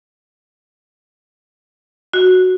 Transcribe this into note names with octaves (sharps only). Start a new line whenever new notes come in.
F#4